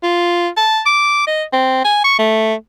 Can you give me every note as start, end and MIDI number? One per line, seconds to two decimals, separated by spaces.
0.03 0.48 65
0.57 0.81 81
0.86 1.24 86
1.27 1.43 75
1.53 1.83 60
1.85 2.00 80
2.04 2.17 85
2.19 2.54 57